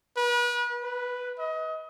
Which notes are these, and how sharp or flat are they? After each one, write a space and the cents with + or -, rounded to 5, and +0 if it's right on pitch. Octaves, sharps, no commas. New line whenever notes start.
B4 -35
B4 +0
D#5 +30